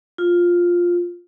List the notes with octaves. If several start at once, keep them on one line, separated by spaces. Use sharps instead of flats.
F4